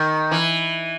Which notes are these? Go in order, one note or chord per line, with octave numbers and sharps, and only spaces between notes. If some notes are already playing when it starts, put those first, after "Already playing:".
Already playing: D#3
E3